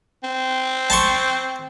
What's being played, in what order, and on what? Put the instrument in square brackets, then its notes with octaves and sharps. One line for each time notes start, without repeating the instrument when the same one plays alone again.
[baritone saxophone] C4
[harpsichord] A5 C6 C#6